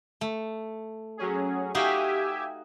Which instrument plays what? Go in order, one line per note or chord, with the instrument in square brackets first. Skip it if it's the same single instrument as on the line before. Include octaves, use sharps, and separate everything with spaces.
[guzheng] A3
[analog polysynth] F#3 C#4 G#4
[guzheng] D#4 F#4 F5 [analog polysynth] G4 E5 G#5